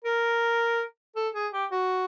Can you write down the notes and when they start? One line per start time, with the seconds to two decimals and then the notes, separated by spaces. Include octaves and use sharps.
0.04 A#4
1.16 A4
1.34 G#4
1.52 G4
1.72 F#4